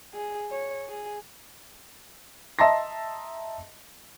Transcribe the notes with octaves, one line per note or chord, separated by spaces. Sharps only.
G#4
C#5
G#4
D#5 E5 A5 A#5 C6 A#6